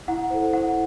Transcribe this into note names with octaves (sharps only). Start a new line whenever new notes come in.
E4 F#5
A4 C5
E4 F#5